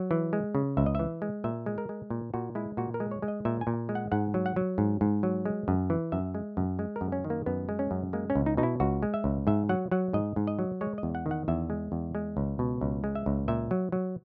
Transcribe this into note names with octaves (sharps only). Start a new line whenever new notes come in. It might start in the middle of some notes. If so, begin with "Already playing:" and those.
Already playing: F#3
E3
G#3
C#3
C#2 E5
D#5
E3 E5
G#3
A#2 E5
G#3
A#4
G#3
A#2
A#2 F#4
G#3 E4
A#2 F#4
A#4
G#3
C#5
G#3
D#5
A#2 E5
G#5
A#2
G#3
F#5
G#2 F#5
F#3
F#5
F#3
G#2
G#2
F#3
G#3
F#2
E3
F#2 E5
G#3
F#2
G#3
A#4
F#2
C#4
D#3
A#3
F#2 B3
G#3
C#4
F#2
G#3 A#3
C#4
C#2
D#4
B2 D#4
E4
C#2 F#4
G#3
E5
C#2
G#2 E5
F#3 F#5
F#3 F#5
G#2 D#5
G#2
D#5
F#3
G#3 C#5
D#5
E2
F#5
D#3
F#5
E2 E5
G#3
E2
G#3
C#2
B2
C#2
G#3
E5
C#2
A#2 E5
F#3
F#3